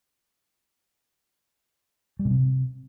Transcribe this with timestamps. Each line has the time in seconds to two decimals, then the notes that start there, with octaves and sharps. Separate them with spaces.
2.19 G3
2.25 B2
2.31 C3